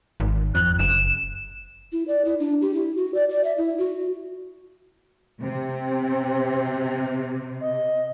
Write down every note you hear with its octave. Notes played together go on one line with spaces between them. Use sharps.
G#1
F2 F#6
F#1 E7
E4
D5
E4
D4
G4
E4
F#4
D5
D5
E5
E4
F#4
C3 C4
D#5